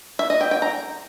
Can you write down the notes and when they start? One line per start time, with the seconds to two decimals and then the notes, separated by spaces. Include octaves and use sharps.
0.19 E5
0.30 D#5
0.41 G5
0.51 G5
0.62 A#5